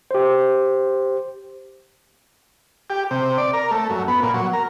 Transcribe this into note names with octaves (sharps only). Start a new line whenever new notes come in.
G4 C5
G4
C3
D5
A#4
A3
F#2
B3
A#2
F#3
A#4